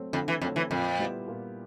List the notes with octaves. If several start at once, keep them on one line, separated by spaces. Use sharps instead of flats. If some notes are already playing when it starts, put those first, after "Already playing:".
Already playing: F#3 A3 C4
F2 D3
E3
F2 F#3 A3 C4
E3
F2 A#2
G3 B3 E4 G4
A#2